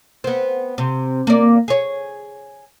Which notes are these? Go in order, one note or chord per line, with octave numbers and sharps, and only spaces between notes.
B3 C4
C3
A#3 D5
G#4 C#5